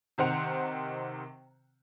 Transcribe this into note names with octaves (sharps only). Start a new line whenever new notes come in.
C3 D#3 C5 F#5 F7